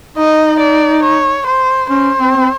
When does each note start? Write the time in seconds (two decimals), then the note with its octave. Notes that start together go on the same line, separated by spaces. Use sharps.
0.17 D#4 D#5
0.60 D5
1.03 C#5
1.47 C5
1.90 C#4 C5
2.19 C4
2.37 C4